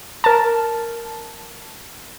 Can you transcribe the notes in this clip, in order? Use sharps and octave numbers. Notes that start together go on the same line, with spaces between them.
A#4 A5